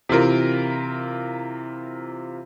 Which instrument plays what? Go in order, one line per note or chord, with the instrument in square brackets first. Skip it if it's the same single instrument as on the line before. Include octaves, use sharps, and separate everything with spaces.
[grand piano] C3 E3 F4 A#4